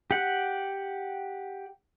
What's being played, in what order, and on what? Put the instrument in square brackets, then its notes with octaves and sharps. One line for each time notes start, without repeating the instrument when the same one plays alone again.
[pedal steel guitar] G4 F#5